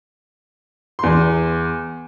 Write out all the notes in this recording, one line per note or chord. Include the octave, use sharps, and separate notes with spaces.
E2 C6